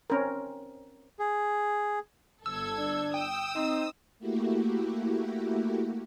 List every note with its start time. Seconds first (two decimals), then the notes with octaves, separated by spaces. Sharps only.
0.10 C4 C#4 A#4
1.19 G#4
2.46 G1 A4 E6 G#6
2.78 D4
3.14 G5 D#6 E6
3.56 C4 D#4
4.19 A3 A#3 E4 F#4 G4